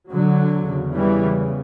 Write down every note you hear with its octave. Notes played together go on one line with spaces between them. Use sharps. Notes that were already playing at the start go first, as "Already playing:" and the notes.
D3 F#3
E2 C#3
E3 G3